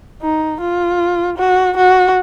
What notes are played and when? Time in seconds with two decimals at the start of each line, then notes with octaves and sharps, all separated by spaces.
0.22 D#4
0.61 F4
1.38 F#4
1.77 F#4